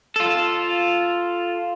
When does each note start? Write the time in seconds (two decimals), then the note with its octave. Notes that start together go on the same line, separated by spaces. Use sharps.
0.16 F4 A4